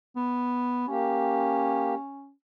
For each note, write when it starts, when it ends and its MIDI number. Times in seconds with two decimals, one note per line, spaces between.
0.16 0.87 59
0.88 1.94 58
0.88 2.32 61
0.88 1.94 67